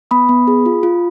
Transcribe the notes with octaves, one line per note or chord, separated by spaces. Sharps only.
B3 B5 D#6
B3
G#4
F4
F4